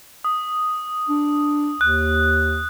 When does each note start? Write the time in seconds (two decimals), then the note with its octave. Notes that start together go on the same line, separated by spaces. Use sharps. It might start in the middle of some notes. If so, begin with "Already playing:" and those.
0.25 D#6
1.09 D4
1.81 D#2 F#6